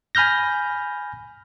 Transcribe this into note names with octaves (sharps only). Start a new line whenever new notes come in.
G#5 B5 F6 G6 A#6